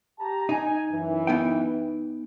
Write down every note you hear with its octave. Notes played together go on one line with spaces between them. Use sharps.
G4 A5 A#5
D#4 G#5
F#2 E3
B3 D#4 G5